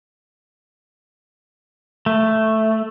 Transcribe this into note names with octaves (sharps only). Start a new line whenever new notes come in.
A3